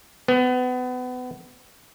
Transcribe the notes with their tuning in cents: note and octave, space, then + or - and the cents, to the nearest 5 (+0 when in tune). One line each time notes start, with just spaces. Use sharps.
B3 +30